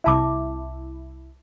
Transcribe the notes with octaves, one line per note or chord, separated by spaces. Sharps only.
C2 E4 E5 A5 D6